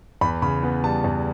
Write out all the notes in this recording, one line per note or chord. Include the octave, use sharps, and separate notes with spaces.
E2 B5
C#3 B5
B3
G3 A5
E2